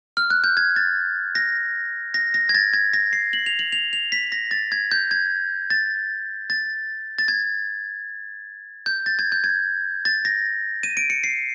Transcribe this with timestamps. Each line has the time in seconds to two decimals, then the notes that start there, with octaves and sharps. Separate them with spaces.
0.17 F6
0.30 F#6
0.44 G6
0.57 G#6
0.76 A6
1.35 A#6
2.14 A#6
2.34 A#6
2.49 G#6
2.55 A6
2.73 G#6
2.93 A#6
3.13 C7
3.33 F#7
3.46 F7
3.59 F#7
3.72 F7
3.93 F7
4.12 B6
4.32 A#6
4.51 A6
4.72 G#6
4.91 G6
5.11 G#6
5.70 A6
6.50 A6
7.18 A6
7.28 G#6
8.86 G6
9.06 A6
9.19 G#6
9.32 G6
9.44 G#6
10.05 A6
10.25 A#6
10.83 D#7
10.97 D7
11.10 C#7
11.24 C7